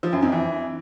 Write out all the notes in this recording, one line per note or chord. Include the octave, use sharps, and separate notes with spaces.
F3
F#2
F2
E3